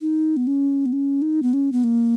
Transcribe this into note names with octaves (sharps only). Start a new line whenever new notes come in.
D#4
B3
C#4
B3
C#4
D#4
B3
C#4
B3
A#3